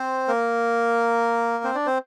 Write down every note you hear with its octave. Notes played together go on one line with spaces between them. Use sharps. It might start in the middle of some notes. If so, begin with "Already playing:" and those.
Already playing: C4 C5
A#3 A#4
C4 C5
D4 D5
C4 C5